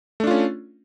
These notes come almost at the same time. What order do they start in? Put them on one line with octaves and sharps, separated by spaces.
A3 D4 F4 C#4